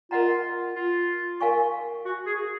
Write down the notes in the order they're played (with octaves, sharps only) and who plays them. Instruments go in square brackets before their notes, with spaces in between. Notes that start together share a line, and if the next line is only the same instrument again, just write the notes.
[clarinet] F4 [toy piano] A#4 D#5 F#5 A#5
[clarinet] F4
[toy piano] A#4 F5 G#5 C#6
[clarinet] F#4
G#4